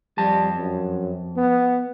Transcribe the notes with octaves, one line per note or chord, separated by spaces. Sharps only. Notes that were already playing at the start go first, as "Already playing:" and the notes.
F2 G3 A5
F#2
B3